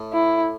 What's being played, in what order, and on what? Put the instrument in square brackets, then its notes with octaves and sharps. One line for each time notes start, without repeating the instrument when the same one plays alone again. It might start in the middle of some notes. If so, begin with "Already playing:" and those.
Already playing: [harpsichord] A2
[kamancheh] E4